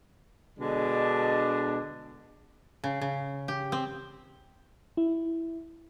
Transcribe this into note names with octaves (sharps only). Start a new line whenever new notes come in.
B2 D3 G#3 D4
C#3
C#3
G4
C4
E4